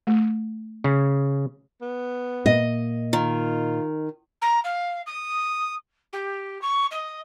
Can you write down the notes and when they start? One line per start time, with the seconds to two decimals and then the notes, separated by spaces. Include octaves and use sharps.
0.07 A3
0.84 C#3
1.82 B3
2.46 A#2 A#3 D#5
3.13 D#3 F4
4.41 A#5
4.64 F5
5.06 D#6
6.12 G4
6.61 C#6
6.91 D#5